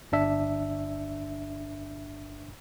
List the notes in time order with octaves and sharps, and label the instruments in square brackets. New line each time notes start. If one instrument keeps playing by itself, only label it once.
[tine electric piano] G1 D4 E5